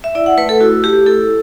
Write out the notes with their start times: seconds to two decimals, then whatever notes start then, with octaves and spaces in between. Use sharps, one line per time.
0.04 E5
0.15 E4 D5
0.26 F#5
0.37 A3 B4
0.49 A4
0.60 E4 F#4
0.83 A3 G4
1.06 E4 A4